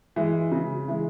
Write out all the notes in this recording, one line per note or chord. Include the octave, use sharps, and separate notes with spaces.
E3 G#3
C#3
E3 G#3